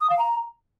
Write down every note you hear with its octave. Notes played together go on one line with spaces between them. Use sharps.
D#6
F5
A#5